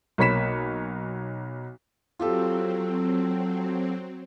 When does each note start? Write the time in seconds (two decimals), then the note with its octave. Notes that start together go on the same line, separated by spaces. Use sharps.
0.18 B1 A#3 C#5 B5 B6 E7
2.19 F#3 C4 F4 G4 A4